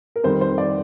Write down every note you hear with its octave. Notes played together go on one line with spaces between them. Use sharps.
A#4
F2 D#3 G3 C5
C5
D5